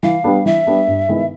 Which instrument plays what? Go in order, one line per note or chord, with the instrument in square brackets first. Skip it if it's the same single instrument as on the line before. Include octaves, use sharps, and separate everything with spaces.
[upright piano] E3 [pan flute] F5
[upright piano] G3 B3 D4
[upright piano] E3 [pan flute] E5
[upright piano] G3 B3 D4
G2
D#3 G#3 B3 E4